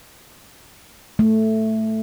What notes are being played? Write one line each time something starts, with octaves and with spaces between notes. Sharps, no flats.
A3